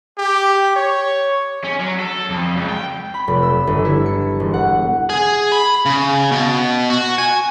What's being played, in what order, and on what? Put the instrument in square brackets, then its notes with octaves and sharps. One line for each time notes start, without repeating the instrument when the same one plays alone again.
[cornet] G4
C#5
[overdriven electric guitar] C#4
F#3
A4
F2
C#2
G5
[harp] B5
F1
E6
G1
E4
C#7
E1
F#5
[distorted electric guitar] G#4
B5
C#3
B2
F#4
G#5